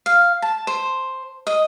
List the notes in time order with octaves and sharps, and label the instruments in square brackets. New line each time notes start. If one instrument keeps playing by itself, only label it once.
[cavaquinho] F5
A5
C5
D#5